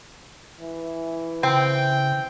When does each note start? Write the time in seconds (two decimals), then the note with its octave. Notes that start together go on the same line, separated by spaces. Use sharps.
0.61 E3
1.43 C#3 C4 G5